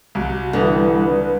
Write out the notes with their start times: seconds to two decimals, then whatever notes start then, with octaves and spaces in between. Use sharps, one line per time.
0.15 C2 F#4
0.53 D3 E3 G3 D4 B4 D#6